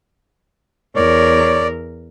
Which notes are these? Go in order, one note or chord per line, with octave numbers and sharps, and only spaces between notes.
E2 A#4 C#5 D5